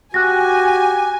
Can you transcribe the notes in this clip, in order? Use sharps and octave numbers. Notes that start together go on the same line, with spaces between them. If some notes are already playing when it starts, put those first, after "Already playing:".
F#4 G4 G#5 F#6 A#6